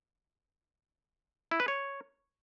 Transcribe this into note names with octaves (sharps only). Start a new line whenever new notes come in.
E4
B4
C#5